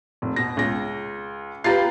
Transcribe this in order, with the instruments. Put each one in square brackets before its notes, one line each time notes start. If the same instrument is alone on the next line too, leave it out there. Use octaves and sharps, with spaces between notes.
[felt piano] F1
B2 A#6
C#2 A#6
[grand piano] F4 G4 B4 [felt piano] A#5 A6 C7